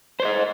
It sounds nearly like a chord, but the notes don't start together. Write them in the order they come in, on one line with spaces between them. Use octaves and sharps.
C5 C#5 D#5